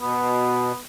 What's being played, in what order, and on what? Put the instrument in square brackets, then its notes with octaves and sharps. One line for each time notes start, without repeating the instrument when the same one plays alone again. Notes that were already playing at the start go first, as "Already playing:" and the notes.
[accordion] B2 [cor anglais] B3